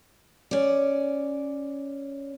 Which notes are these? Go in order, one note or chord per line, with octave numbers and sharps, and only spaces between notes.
C#4 D5